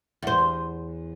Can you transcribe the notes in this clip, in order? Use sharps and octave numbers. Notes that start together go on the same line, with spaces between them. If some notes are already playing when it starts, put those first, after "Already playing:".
E2 C5